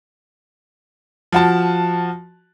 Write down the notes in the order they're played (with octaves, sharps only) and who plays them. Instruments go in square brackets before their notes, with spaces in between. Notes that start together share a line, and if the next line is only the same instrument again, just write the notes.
[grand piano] F3 F#4 A5